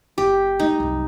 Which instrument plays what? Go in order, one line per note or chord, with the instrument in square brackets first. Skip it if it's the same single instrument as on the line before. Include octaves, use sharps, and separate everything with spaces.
[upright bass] F#1 [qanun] G4
[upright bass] G#3 E4 [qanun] D#4
[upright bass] C2 F#2